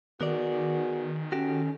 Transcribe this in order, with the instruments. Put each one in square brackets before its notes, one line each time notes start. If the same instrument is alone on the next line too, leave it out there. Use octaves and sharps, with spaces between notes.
[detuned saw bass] D#3 [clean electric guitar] B3 A#4 D5 [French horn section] F#4 G#4
[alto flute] C#4 [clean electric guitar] F#4 G4 [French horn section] A4